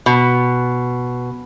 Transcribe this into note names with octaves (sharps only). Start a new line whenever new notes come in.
B2